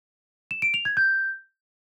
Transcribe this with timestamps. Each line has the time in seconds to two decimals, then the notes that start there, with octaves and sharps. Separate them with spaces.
0.51 E7
0.62 D7
0.74 F7
0.85 G#6
0.97 G6